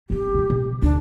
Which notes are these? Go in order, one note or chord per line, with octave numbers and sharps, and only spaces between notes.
G3 C4 G4
B2 G#3
B2
D2 D4